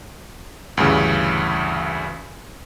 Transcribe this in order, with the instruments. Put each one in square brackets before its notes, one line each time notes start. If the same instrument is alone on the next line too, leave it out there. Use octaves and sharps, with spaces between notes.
[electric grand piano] D2 G2 C#3 E3